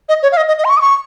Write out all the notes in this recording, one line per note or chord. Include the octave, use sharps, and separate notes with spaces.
D#5
C#5
F5
D#5
D#5
D#5
C6
C#6
D#6
C#6